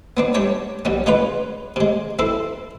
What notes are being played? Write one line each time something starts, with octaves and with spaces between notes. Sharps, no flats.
B3 C4 D4
G3 D4 C#5 G5
B1 G3 C#4
G#3 C#4 F4 B4
C3 G#3
C4 E4 A4